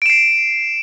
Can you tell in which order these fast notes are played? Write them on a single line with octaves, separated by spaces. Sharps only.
D7 E7 C7